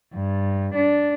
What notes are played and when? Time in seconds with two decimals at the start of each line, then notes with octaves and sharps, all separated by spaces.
0.13 G2
0.74 D4